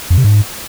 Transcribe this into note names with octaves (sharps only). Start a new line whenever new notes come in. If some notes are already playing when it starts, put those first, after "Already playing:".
F2
C3
G#2